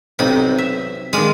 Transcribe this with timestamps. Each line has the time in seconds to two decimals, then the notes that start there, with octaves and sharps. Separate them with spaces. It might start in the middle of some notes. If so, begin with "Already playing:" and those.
0.19 B1 C3 C4 D#4 B5
0.58 E5
1.13 D#3 G#3 D5 F5 B5